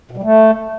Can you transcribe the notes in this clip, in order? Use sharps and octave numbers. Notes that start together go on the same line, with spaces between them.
B2
G3
A3